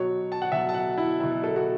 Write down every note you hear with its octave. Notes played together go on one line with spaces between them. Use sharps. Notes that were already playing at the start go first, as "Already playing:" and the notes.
Already playing: B2 F#3 C#5
A5
F#5
B2 F#3 E5
A5
F#5
E4
B2 F#3 E4
A4
F#4